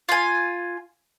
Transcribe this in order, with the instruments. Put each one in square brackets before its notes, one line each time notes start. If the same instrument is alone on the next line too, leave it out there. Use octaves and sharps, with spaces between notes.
[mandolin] F4 G#5